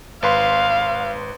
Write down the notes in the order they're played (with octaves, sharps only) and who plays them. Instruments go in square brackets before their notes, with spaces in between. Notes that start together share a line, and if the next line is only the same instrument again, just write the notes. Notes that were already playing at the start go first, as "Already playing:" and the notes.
[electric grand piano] G#1 B4 C6 [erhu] F5